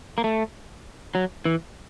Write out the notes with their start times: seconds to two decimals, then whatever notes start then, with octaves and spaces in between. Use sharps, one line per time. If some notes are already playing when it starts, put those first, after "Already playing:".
0.18 A#3
0.24 A3
1.15 F#3
1.45 E3